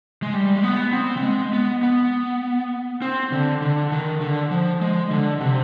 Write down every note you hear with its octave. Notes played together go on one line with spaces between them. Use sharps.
G#3
G3
G#3
B3
C4
B3
G#3
B3
B3
C4
D3
D3
D#3
D3
F3
G#3
D3
C3